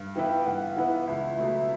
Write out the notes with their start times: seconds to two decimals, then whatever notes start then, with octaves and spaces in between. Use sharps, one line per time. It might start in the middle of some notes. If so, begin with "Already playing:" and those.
Already playing: G2
0.15 E3 B3 E4 B4 G5
0.47 G2 F#5
0.76 E3 B3 E4 B4
1.07 C#2 E5
1.38 B2 F#3 A3